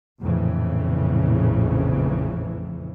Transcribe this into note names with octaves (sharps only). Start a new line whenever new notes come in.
A#1 F2 A2 C#3 E3